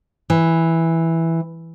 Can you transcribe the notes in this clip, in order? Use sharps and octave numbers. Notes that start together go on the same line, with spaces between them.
E3